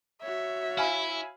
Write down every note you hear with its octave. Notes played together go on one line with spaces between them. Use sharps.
F#4 C#5 E5
E4 F5 G#5 B5